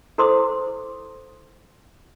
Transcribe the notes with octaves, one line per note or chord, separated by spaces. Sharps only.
E4 A4 C5 C6 D6 D#6